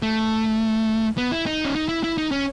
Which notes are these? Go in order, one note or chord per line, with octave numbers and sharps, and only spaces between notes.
A3
B3
E4
D#4
C#4
D#4
E4
E4
D#4
C#4